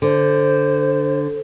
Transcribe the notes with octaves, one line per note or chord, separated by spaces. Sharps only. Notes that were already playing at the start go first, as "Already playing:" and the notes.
D3 C5